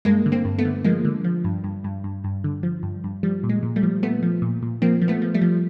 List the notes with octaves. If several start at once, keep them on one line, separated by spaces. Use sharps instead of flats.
G2 G#3 A#3
D3
A#3 C4
G2
A3 B3
D3
F3 G#3 A#3
D3
F3
G2
G2
G2
G2
G2
D3
F3
G2
G2
F3 G3
A#2
G#3
A#2
G3 A3
F3
A#2 A3 B3
F3
A#2
A#2
F3 A#3 C4
F3
A3 B3
F3
G3 A3
F3